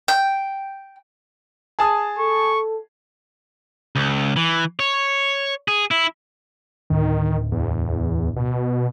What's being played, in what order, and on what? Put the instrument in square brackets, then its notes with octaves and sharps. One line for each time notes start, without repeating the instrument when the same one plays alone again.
[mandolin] G5
[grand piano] G#4 A5 D#6
[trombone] A4 [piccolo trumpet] C#6
[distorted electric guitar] C#2
E3
C#5
G#4
E4
[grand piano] D1 [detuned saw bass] D#3
[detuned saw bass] E2
B2